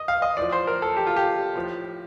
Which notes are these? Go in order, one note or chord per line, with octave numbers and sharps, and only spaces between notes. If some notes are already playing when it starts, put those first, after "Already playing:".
Already playing: D#5
F5
D#5
A2 F3 D5
C5
A#4
A4
G4
F4
G4
A2 F3